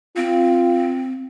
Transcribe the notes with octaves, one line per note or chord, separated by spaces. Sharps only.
C4 F4